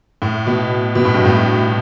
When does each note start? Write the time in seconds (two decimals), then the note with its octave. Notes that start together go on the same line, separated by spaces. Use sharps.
0.22 A2
0.47 B2
0.95 B2
1.05 A2
1.14 G2
1.25 A2